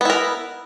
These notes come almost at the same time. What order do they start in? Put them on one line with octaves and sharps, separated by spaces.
B3 E4 A#4